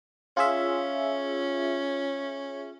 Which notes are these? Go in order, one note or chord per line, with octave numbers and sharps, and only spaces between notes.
C#4 F4 G#4 E5